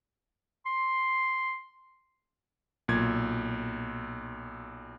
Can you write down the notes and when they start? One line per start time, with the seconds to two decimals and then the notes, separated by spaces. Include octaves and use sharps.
0.66 C6
2.88 B1 A#2 G#6